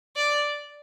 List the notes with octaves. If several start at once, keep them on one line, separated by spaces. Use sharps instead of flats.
D5